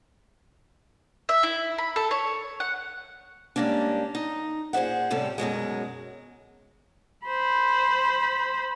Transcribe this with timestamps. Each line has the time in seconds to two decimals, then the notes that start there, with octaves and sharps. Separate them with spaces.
1.29 E5
1.43 E4
1.78 B5
1.96 A4
2.11 C#5
2.60 F#5
3.56 G3 G#3 A#3 C#4 D4
4.15 D#4
4.73 A#2 G#4 C5 E5 F#5
5.10 A2 C3 G3 C#4 A4
5.38 F#2 B2 F#3 G#3
7.27 C5 B5